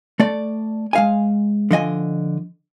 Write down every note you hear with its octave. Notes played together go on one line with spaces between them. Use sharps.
A3 D5
G#3 F5 G#5
D3 F3 D#5 G#5